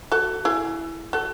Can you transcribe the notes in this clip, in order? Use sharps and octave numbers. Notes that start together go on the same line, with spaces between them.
F#4 A4
E4 G#4
F#4 A4